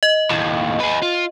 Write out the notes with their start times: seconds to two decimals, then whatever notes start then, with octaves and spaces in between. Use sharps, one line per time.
0.03 D#5
0.30 D#2 A2
0.80 G#4 B4
1.02 F4